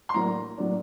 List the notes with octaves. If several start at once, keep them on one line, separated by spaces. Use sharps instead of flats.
C6
A2 F#3 A#3 D4 A#5
A2 F#3 A#3 D4